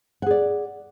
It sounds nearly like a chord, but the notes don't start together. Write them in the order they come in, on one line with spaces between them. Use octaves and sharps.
F#5 G#4 D5